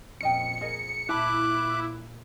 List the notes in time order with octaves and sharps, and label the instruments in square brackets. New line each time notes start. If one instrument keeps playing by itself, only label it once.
[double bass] F2 A#2 [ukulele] C#4 D#5 G5 [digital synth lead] C#7
[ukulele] G#4 A#4 D#5 [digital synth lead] C#7
[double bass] A#2 [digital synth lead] E4 [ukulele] E5 A5 B5 [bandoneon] D6 F#6